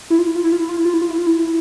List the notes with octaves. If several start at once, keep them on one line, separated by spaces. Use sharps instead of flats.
E4
F4
E4
F4
E4
F4
E4
F4
E4
F4
E4
F4
E4
F4
E4